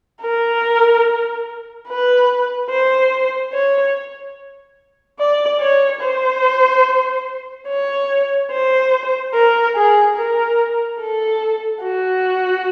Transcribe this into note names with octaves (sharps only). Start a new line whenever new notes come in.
A#4
B4
C5
C#5
D5
C#5
C5
C#5
C5
A#4
G#4
A#4
A4
F#4